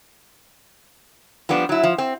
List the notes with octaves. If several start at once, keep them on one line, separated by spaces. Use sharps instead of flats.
F3 G3 B3 D4
F#3 E4
F3
C4